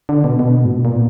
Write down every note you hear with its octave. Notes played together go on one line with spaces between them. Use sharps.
D3
B2
B2
G#2
A#2
A#2